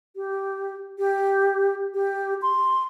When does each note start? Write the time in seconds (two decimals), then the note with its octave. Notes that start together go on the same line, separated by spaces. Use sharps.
0.16 G4
0.98 G4
1.94 G4
2.42 C6